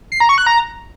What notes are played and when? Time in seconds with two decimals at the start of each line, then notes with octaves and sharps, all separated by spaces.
0.12 C7
0.20 A#5
0.29 C#6
0.38 F#6
0.47 A#5